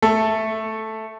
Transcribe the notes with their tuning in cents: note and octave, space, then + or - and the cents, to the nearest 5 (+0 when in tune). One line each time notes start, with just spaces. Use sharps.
A3 +0 A4 +0